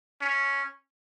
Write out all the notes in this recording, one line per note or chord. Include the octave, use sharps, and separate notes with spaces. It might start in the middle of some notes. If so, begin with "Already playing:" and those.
C#4